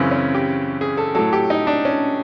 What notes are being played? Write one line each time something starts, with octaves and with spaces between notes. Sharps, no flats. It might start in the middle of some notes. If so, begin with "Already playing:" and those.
Already playing: F#2 C#3 E3 C4
C#4
G4
G#4
A4
A2 F#3 A4
G4
D#4
D4
C#4